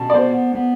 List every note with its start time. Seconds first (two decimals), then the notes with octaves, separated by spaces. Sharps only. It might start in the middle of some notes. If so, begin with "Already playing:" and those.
Already playing: B2 A5
0.10 D5
0.13 B3 C5
0.55 B3